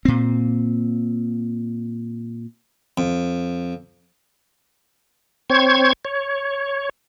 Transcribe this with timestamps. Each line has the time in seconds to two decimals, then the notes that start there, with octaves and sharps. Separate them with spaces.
0.05 A#2 C4
2.98 F2
5.50 C4 C5 C#5 C#6 G#6
6.05 C#5